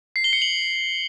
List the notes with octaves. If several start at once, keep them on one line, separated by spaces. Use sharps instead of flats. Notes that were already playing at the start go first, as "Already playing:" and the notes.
C7
G7
C#7
F#7